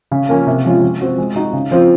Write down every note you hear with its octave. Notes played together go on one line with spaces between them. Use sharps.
C#3
F3 A#3 C#4
C3
F3 G#3 C#4 F4
F3
C4 F#4
G#3
D#4 F#4
C#3
F3 C4 F4